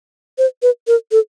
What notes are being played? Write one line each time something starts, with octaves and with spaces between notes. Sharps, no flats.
C5
B4
A#4
A4